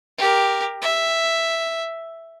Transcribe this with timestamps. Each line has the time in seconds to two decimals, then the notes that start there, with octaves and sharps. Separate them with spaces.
0.18 G4 A#4
0.82 E5